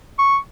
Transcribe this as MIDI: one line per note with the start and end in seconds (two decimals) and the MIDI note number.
0.19 0.37 85